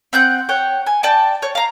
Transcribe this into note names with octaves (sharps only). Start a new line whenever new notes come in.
C4 F#5 G6
C#5 F#5 G5
G#5
D5 G5 A5
C#5
F5 A#5